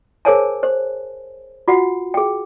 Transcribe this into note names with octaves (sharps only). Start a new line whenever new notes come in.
G#4 A#4 C5 C#5 G#5 A5
C5
F4 F#4 F#5
G#4 G5